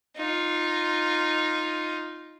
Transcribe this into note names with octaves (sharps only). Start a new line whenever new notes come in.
D#4 F4